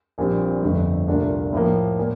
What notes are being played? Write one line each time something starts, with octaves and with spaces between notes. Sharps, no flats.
A#1 A#2 G3 C4
G1 F2 D3 A3
C2 A#2 A3 D4 F4
A2 F3 A#3
A#2